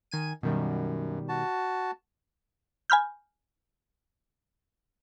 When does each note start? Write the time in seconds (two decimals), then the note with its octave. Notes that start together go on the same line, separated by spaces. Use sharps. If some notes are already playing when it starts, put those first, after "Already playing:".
0.11 D#3 G#5 D#7
0.43 F#2 B2 D#3 G3
1.29 F#4 A5
2.90 G#5 B5 F6 G6